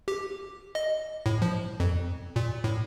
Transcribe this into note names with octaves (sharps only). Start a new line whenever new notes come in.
G4
D#5
A2
F3
F2
A#2
A2